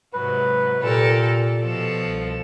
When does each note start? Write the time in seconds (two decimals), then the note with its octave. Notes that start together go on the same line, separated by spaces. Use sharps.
0.14 G#2 C3 F#3 B4
0.83 A#2 G4 A4 A#4
1.22 A4
1.61 B2 F3 A4
2.02 C2